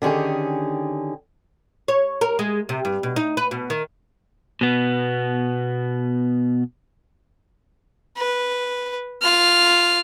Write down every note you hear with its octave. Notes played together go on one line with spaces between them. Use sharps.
D3 D#3 C#4 G4 G#4
C#5
A#4
G#3
C3
G2
B2
D#4
B4
B2
D#3
B2 B3
B4
F4 F6